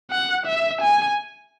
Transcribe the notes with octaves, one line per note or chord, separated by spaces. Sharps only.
F#5
E5
G#5